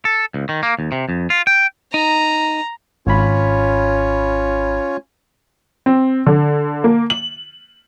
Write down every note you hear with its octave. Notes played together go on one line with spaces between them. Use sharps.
A4
C#2
D#3
A#3
D#2
C3
F2
F4
G5
D#4 A#5
G#1 C#4 F4 C#5 B5
C4
D3
A#3
F#7